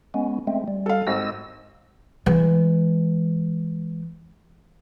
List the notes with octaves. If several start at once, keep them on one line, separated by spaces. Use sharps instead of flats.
G#3 B3 C#4
G#3 A3 C4
G3
A4 F5
G#1 D#5 E6
E3 G#3